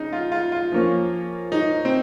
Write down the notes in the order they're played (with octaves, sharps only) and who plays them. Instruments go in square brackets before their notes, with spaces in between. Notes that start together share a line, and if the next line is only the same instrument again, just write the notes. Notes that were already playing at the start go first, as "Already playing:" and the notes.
Already playing: [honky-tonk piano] C#3 [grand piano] D#4
[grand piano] F4
F4
F4
[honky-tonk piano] F3 A#3 C#4
[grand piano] D#4
C4